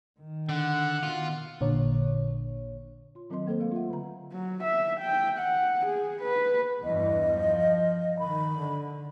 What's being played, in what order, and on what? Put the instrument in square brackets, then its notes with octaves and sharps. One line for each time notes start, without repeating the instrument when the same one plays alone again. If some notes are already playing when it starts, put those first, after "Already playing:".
[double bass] D#3
[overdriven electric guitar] D3 [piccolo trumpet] F#5
[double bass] B2 D#3 [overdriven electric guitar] F4
[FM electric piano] A1 A#2 D3 C#5
[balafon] F4 C6
D#3 F#3 C4 A#4 D#5 C6
A3 A#3 A4 A#4 C5
G#3 A#4 F5
F4 E5 F#5
D3 A#5
[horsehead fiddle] F#3
E5
G5
F#5
G#4
B4
[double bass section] E2 G2 E3 [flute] D#5
[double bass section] F3
[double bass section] D#3 [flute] B5
[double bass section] D3